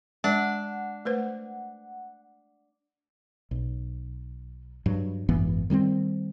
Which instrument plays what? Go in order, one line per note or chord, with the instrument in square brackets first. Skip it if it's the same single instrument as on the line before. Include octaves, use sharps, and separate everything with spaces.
[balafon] G#3 [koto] D4 [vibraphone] F#5
[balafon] A3 B4 C5
[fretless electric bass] B1
G2 F#3
G#1 F#2 E3 B3
D#3 G3 A#3 C4